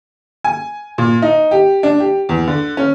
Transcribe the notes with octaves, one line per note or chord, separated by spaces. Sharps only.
G#5
A#2
D#4
G4
D4
G4
E2
D3
C#4